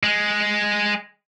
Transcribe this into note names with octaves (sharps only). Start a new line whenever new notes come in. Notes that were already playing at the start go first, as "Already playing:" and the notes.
G#3